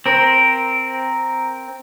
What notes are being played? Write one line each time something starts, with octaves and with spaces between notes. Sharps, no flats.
C4 A#4